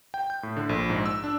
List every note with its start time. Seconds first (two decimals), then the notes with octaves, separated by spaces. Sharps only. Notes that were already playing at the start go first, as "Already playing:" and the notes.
0.14 G5
0.30 G6
0.43 A2
0.57 D3
0.69 A#1
0.90 G#2
1.06 E6
1.24 D4